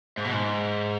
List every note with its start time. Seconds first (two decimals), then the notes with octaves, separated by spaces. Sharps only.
0.17 G#2
0.25 B2
0.33 G#2